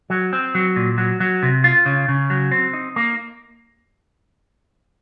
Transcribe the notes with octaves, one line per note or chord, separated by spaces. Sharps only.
F#3
C4
F#3
A#2
F#3
F#3
C3
F4
C#3
C#3
F#3
C4
D#4
A#3